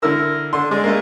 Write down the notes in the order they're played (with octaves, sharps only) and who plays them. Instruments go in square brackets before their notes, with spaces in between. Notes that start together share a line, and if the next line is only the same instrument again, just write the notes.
[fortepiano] D3 E4 E6 [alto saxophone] A#4
[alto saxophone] D3 [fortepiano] C6
[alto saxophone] G#3 [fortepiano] D4
[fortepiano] A3 A#3